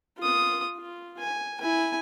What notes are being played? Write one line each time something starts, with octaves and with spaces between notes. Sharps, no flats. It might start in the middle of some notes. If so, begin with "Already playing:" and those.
F4 D#6
F4
G#5
E4 G#5